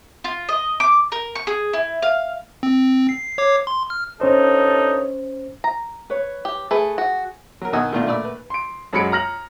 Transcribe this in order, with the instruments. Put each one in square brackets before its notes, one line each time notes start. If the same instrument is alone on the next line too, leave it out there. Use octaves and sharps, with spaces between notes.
[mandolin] F4
D#5
D6
A#4
C#6
G#4
E4
F5
[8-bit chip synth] C4
C7
C#5 D6 C7
C6
F6
[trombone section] G2 D#4 A4 [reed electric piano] C#4 C5 [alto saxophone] C#5
[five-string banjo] A#5
[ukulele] B4 C#5
[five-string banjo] G4
[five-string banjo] A3 B4 [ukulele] G#4
[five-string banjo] F#4
[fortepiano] F#3 A#4
B2 D#3 D#5 F#5 G#5 E6
B2 D#3 A3 D4 F4
A#2 A3 D5 B5 E6
B4
[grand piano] C6 D7
F#2 F#3 G#3 B5 C#7 D7
A#5 F6 A#6 F#7